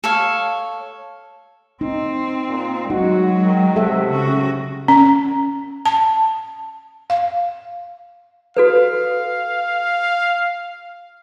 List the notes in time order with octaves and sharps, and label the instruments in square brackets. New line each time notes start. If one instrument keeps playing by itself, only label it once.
[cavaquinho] A4 C#5 F5
[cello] C4 [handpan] D#4
[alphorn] A#2
[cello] F#3 G#3 [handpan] D#4 [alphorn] F#4
[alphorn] D#3
[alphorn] C3 [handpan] A4 E5 F#5
[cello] C#3 F#4
[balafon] C#4
A5
F5
[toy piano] F#4 A4 B4 [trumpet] F5